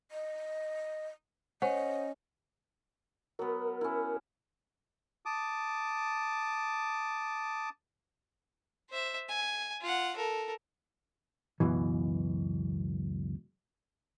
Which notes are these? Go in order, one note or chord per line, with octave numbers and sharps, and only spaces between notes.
D#5
C#4 C5 C#5 D#5 F#5
F#3 B3 A#4
C#4 E4
A5 D6 D#6
C5 E5
G#5
F4 F#5
A4 A#4
C#2 F#2 B2 E3